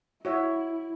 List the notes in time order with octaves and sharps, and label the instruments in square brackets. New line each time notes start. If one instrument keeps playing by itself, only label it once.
[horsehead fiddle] E4 [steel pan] F#4 C#5 E5